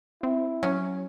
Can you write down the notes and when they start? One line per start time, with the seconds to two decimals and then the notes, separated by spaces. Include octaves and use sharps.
0.23 C4 E4
0.63 F#3 C#4